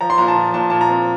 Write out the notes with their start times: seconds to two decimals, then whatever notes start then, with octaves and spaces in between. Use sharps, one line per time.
0.01 F3 A#5
0.10 C6
0.18 A#2 A#5
0.28 A5
0.36 F3
0.54 A#2 A5
0.70 A#2 A5
0.81 A#5
0.89 C4